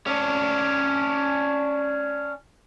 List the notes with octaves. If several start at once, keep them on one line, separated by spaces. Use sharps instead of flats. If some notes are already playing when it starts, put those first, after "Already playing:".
C#4 D4